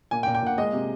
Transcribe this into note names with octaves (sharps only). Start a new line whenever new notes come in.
A#2 G#5
G5
A#2
G5
A#2 F#5
G#3 D#5
C3